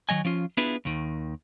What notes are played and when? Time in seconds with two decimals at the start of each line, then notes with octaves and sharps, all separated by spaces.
0.09 D#3 F#3 D#5 G#5
0.25 F3 C#4 F4
0.57 B3 D4 E4 F4 G#4 B4
0.85 D#2 D#3